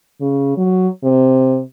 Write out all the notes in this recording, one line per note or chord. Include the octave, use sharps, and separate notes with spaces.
C#3
F#3
C3